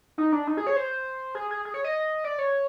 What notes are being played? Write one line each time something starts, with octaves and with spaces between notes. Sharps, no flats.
D#4
D4
D#4
G#4
C#5
C5
G#4
G#4
G#4
C#5
D#5
D5
C#5